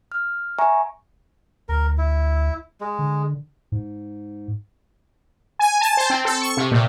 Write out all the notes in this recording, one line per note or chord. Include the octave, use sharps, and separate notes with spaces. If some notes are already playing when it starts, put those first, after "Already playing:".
F6
E5 G#5 A#5 C#6
D2 A#4
E4
G#3
D3
G#2
G#5
A5
C5
C4
A4
C#6
C3
A#2